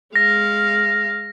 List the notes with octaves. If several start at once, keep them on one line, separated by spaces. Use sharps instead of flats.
G#3 F5 A#6